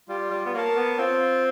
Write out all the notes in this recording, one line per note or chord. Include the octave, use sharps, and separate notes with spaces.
G3 F4
G3
B3
A#3 A#4 C#5 F5 A5
B3
C4 F4